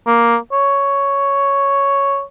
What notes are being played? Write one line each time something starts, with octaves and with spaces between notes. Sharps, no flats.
A#3
C#5